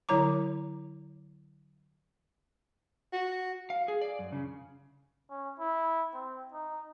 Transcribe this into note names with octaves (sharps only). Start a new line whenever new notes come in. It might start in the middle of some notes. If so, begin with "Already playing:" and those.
D3 F#3 E4 C#5 A#5 D6
F#4
F5
G#4
D5
F#2
C#3
C#4
E4
C4
D#4